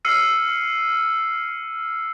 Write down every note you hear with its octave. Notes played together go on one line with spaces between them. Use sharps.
E6 F6 C7 C#7 D#7